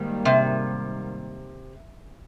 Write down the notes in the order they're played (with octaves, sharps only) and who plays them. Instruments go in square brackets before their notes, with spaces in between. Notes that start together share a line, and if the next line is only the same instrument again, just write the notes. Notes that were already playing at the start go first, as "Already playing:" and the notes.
Already playing: [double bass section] G#2 D#3 G3 A#3
[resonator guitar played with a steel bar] C3